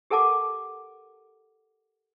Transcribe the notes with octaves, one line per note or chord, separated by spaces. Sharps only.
G4 A4 A#4 F#5 A5 D6